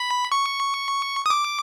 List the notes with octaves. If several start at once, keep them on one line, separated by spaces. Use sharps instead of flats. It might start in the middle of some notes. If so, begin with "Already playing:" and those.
Already playing: B5
C#6
D#6
D6